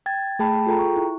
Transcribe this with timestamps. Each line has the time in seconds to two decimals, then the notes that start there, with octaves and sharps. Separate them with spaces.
0.06 G5 G#6 A6
0.39 A3 G#4 G5 A5 B5
0.66 F4 G#4 A4 G5 A#5
0.79 C#6
0.96 E4